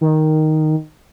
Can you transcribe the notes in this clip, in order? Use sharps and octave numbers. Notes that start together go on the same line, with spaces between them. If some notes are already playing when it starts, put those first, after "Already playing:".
D#3